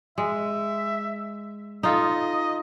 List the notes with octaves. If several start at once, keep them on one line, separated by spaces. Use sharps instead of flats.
G#3 E5
D#4 F4 A4 D#5